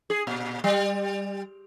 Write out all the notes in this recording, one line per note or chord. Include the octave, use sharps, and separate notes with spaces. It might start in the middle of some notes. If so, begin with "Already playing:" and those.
G#4
A#2
G3